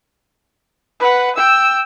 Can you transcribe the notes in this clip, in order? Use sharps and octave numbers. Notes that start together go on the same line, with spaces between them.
B4 F#5
G5 E6